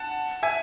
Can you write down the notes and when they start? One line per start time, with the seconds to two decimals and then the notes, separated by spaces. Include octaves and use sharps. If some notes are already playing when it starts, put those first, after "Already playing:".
Already playing: F#5 A5
0.43 E5 G#5